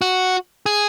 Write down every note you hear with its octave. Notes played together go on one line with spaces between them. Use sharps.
F#4
G#4